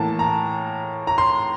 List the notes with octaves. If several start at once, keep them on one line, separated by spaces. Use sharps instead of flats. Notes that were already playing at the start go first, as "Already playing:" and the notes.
Already playing: A2 E3 A#3 A5
A#5
A#5
C6